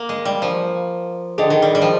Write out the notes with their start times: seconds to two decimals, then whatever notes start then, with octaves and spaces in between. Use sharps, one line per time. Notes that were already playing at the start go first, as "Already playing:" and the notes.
Already playing: A#3
0.09 G#3
0.25 G3
0.42 F3
1.38 D3 G#4 D#5 G5
1.50 D#3
1.62 G3
1.75 G3
1.82 F3